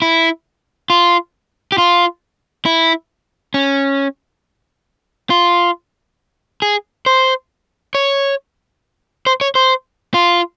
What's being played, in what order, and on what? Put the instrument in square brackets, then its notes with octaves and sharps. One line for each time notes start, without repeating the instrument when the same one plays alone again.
[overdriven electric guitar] E4
F4
G4
F4
E4
C#4
F4
G#4
C5
C#5
C5
C#5
C5
F4